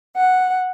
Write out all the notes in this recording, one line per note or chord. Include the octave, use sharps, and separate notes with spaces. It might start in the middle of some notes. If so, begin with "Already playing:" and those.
F#5